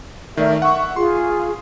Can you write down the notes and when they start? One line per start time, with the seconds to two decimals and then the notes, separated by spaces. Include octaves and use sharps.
0.37 D#3 A3 A#4 D5 E5
0.62 E5 F#5 C#6
0.96 F4 G#4 C6